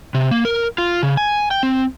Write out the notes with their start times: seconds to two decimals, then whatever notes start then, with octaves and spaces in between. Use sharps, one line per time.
0.14 C3
0.31 A#3
0.45 A#4
0.78 F4
1.03 C#3
1.17 G#5
1.51 G5
1.63 C4